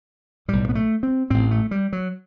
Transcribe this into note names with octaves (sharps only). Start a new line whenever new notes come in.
B1 A2 G3
B3
A3
C4
A1 A2 C4
A3
G3
F#3